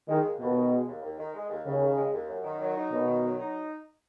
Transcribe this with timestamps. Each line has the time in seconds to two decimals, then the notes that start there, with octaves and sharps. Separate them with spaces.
0.09 D#3 G#3
0.24 D#2
0.40 D#2 B2
0.56 D#3
0.71 G#3
0.88 D#2
1.03 D#2
1.18 D#3
1.34 G#3
1.50 D#2
1.66 D#2 C#3
1.82 D#3
1.97 G#3
2.13 D#2
2.29 F#2
2.44 D#3
2.61 F#3
2.76 D#4
2.92 F#2 B2
3.07 D#3
3.24 F#3
3.39 D#4